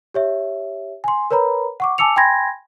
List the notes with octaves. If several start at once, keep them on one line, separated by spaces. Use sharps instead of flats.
G4 C#5 E5
G#5 C6
A#4 B4 C#5 A#5 B5
F#5 C#6 D6
G#5 A5 D6 E6 C#7 F7
G5 G#5 B5 C6 G#6 A#6